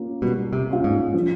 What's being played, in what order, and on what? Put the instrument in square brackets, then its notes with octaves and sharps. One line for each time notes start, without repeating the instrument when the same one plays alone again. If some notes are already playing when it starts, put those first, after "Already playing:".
Already playing: [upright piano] A#3 C#4 F4
[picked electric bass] B2 [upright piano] G3
[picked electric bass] C3
[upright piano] A#3 C#4 F4
[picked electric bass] G#2
[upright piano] F3